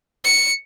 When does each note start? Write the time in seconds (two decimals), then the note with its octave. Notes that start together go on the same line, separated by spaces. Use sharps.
0.24 C#7